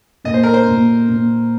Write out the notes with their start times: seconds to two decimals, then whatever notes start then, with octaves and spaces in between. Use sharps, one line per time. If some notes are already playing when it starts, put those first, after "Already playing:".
0.24 A#2 D#5
0.34 C5
0.44 A#4
0.54 C5
0.67 A#2
1.09 A#2